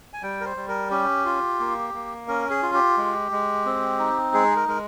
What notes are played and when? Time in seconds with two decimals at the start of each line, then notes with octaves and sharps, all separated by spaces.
0.13 G#5
0.23 G3 G5
0.41 A#4
0.45 C5
0.57 G3
0.68 A#4
0.91 C#4 G4
1.25 F4
1.60 A#3
1.94 A#3
2.28 C#4 A#4
2.50 G#4
2.63 F4
2.74 G4
2.97 G#3
3.31 G#3
3.65 C4
3.99 D#4
4.33 G#3 G#4
4.56 A#4
4.68 G#3 A#4